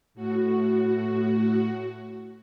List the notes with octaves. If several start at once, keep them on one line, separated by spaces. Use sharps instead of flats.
A2 F#4